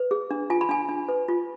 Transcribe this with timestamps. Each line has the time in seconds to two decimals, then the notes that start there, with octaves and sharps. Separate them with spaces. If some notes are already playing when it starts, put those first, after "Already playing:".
Already playing: B4
0.11 G#4
0.31 D4
0.50 F4 G#5
0.61 B5
0.69 D4 G#5
0.89 D4
1.08 B4
1.28 F4